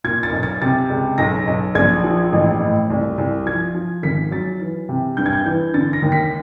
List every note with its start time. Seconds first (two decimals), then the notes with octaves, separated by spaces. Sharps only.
0.04 A#2 G#6
0.23 A6
0.32 B1
0.43 A6
0.62 C3 A6
0.90 C#2
1.18 B1 A#6
1.47 B1
1.75 A#1 G#6
2.04 F3
2.33 A1
2.60 A2
2.90 C2
3.18 C2
3.46 F3 G#6
3.74 F3
4.03 G#1 B6
4.31 F#3 A6
4.60 E3
4.89 C3
5.17 G2 G6
5.26 G#6
5.33 G6
5.46 E3 G6
5.74 D3 A6
5.93 A#6
6.02 D#2
6.12 B6